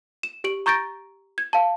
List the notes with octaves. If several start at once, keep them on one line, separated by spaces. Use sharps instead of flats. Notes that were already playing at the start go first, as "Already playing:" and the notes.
E7
G4 D7 F#7
A#5 C#6 G6 A6 A#6 D7
G#6
F5 A5